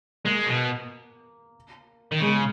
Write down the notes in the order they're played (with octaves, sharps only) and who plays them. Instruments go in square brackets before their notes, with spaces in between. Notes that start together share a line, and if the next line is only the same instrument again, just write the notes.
[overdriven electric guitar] G#3 [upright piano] A#3
[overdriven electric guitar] B2
D#3
[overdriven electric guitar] C#3 [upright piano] G#3